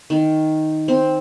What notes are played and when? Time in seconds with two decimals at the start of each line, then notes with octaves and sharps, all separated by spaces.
0.10 D#3
0.88 C4